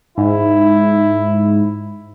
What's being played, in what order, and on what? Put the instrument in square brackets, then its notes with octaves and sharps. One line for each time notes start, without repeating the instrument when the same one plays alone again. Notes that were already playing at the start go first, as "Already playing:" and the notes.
[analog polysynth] G#2 [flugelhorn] E4